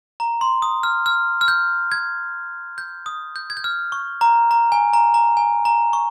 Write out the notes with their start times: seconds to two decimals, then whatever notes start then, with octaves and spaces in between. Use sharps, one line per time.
0.20 A#5
0.41 C6
0.62 D#6
0.83 F6
1.06 F6
1.41 F6
1.48 G6
1.92 G#6
2.78 G6
3.06 D#6
3.36 G6
3.50 G#6
3.57 G6
3.64 F6
3.92 C#6
4.21 A#5
4.51 A#5
4.72 G#5
4.94 A#5
5.14 A#5
5.37 G#5
5.65 A#5
5.93 C#6